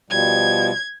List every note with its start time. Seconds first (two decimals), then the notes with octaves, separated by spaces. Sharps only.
0.10 B2 F3 G3 G#6